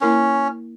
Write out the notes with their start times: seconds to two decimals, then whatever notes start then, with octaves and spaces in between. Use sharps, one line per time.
0.01 A#3 C#4 E4 A#4